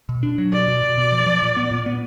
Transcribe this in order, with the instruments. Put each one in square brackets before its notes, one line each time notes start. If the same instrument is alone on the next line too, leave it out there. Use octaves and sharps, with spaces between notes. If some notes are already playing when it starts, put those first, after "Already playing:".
[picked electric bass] B2
D4
F#3
[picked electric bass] B2 [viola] D5
[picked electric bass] B2
B2
B2
F3
F3
A#2
B3
A#2
B3